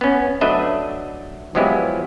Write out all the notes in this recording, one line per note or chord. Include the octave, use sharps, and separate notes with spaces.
B3 C#4
F#3 A3 D4 B4 D#5 E5
F3 F#3 G#3 B3 E4 G4